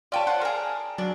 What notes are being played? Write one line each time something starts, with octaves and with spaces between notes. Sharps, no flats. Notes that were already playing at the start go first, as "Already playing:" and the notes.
F4 G4 C#5 D5 G5 A5
F4 C5 F#5
G#4 A#4
F#3 D4